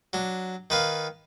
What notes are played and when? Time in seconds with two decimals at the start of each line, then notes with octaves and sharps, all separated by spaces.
0.13 F#3 D4
0.70 D#3 B4 F5